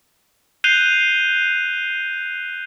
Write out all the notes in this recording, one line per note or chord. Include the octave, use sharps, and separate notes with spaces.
F#6 G6 C7 D#7 F7 G7